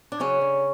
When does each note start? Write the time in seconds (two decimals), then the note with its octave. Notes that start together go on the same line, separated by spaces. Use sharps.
0.12 D4
0.20 C#3 F#3 C#4
0.41 D3